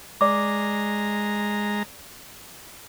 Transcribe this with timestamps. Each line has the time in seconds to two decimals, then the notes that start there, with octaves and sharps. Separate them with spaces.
0.21 G#3 D5 A#5 D6